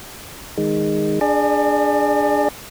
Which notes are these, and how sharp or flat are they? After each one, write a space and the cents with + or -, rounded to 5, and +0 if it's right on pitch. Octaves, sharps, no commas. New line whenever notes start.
D#3 +0 G#3 -15
D4 +0 G#4 +0 D5 +40